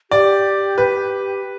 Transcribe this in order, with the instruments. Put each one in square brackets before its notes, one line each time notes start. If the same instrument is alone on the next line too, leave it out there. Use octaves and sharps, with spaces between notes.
[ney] G4 [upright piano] D5
[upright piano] B4